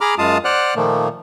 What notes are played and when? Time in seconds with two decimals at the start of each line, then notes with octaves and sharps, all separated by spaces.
0.01 G#4 A#5 B5 D6 F6
0.18 F#2 G#3 F4 F5 A5 D#6
0.45 C5 D5 F#5 F6 F#6
0.76 A#2 D#3 F3 A3 A#3